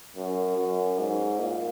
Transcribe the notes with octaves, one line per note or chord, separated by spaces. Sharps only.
F#2
F#2
G#2
A#2